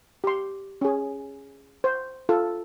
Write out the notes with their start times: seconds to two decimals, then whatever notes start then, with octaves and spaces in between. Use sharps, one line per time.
0.24 G4 C6
0.81 C#4 G#4
1.84 C5
2.29 F4 A4